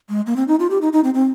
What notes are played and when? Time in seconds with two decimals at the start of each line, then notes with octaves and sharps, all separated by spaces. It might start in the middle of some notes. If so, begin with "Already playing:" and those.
0.09 G#3
0.26 A#3
0.36 C4
0.48 D#4
0.59 F4
0.70 G4
0.81 D#4
0.93 D#4
1.04 C4
1.14 C4